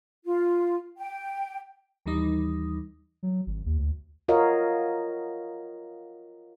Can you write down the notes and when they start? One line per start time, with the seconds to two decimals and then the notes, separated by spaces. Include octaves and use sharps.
0.24 F4
0.98 G5
2.06 D#2 E3 G3 D#4 D#6
3.23 F#3
3.46 G#1
3.65 D#2
3.79 D2
4.28 F4 F#4 A#4 C#5 D#5 F5